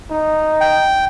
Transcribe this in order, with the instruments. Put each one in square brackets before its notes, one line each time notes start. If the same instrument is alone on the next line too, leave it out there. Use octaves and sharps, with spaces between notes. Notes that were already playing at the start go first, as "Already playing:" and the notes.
[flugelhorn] D#4
[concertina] G5